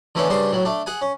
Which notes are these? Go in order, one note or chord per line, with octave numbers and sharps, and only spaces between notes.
D3 E3 A3 B3 C#4 D4
G2 C#3 D4 C5 C6
A2 F#3
A3 D4
G#4 F#5 G#5
C#4